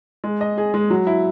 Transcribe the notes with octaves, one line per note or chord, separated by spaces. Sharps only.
G#3
D#5
G#4
G#3
F#3
E4